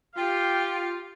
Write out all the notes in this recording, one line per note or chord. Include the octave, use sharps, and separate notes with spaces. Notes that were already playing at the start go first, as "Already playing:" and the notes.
F4 G4 F5 G5